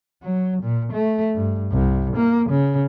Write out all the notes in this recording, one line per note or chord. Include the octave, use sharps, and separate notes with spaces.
F#3
A#2
A3
G2
C2
A#3
C#3